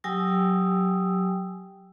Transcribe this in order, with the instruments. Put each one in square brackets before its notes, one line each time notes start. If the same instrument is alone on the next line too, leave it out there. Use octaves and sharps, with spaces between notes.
[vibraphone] F#3 G4 G5 G#5 D#6 E6